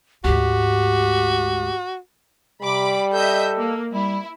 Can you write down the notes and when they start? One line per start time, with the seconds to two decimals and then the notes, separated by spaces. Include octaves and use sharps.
0.24 D2 G#2 F#4 G4
2.62 C3 G3 B5 D6
3.13 A4 D#5 E5 G6
3.58 A#3
3.93 G3 E4